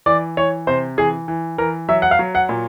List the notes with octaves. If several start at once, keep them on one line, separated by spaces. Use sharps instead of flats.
E3 D5
E3 C#5
C3 C5
E3 G#4
E3
E3 A#4
F#3 E5
F#5
F5
F#3
F#5
A#2